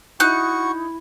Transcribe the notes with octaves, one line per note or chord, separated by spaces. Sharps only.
D#4 E4 F#4 C#6 F#6